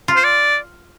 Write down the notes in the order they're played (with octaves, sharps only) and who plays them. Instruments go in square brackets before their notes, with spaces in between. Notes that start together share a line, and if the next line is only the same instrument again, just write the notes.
[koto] F4
[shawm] C5
D5